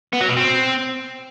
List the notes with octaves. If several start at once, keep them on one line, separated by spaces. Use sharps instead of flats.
B3
F#3
B2
C4